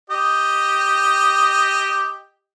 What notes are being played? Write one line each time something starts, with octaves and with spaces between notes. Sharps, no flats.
G4 D#5